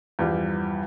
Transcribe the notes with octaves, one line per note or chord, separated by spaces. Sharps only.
E2 G2 F3 G3